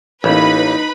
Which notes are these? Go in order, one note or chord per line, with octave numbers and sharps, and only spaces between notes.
A1 E3 A#3 D#4 B4 B5